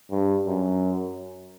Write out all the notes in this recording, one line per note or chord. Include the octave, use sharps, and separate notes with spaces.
G2
F#2